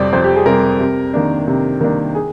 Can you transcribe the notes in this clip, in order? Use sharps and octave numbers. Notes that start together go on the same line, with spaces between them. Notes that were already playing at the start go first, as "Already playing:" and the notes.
Already playing: F2 C3 G3 C4 D5
F2 C5
G4
G#4
C3 G3 C4 A#4
C3
D#3 A#3 D4
C3
D#3 A#3 D4
G#4